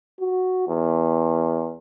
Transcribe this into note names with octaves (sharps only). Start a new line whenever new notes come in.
F#4
E2